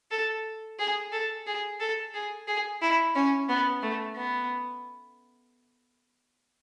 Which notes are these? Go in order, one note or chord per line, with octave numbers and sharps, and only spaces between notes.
A4
G#4
A4
G#4
A4
G#4
G#4
E4
C#4
B3
A3
B3